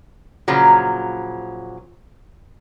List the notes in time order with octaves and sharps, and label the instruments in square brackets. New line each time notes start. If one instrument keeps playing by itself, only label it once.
[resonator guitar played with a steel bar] A#2 C#3 F3 F#3